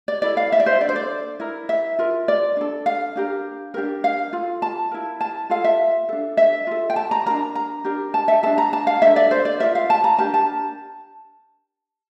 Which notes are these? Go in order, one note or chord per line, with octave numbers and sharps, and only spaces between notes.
D5
E4 A4 D5
F5
E5
D5
C5
D4 A4 D5
C5
D5
E4 A#4
E5
F4 A#4
D5
D4 A4
F5
D4 G4 A#4
D4 G4 A#4
F5
F4 A4
A5
E4 A#4
A5
F4 A4 F5
E5
D4 A4
E5
F4 A4
G5
A5
A#5
D4 F4 A#4 A#5
A#5
D4 G4 A#4
A5
E5
D4 A4 A5
A#5
A5
F5
D4 A4 E5
D5
C5
D5
F4 A#4 E5
F5
A5
A#5
D4 G4 A#4 A5
A5